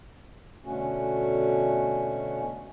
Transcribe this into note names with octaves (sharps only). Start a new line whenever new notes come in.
B2 D3 A3 C#4 F#4